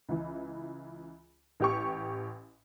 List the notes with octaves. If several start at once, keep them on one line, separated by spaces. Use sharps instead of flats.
C#2 E3
A1 G4 C#6